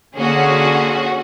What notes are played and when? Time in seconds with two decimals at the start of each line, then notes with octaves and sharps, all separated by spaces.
0.18 D3 A#3 C#4 F#4 G#4